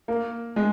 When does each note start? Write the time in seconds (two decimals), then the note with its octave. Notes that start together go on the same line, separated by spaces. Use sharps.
0.08 A#3
0.56 G#3